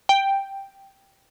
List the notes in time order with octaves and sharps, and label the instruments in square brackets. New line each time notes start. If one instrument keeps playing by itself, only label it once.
[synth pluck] G5